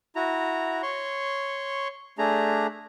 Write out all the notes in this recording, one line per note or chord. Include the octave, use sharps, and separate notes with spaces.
E4 F#4 A#5
C#5 C6 C#6
A3 D4 G#4 A#5